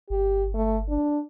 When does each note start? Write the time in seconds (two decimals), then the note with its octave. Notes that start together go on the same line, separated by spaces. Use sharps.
0.10 G1 G4
0.54 A3
0.88 D4